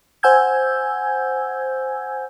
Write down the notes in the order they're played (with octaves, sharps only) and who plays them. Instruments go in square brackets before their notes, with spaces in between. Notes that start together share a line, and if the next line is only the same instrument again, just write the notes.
[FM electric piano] C5 F#5 G#5 E6 G6 G#6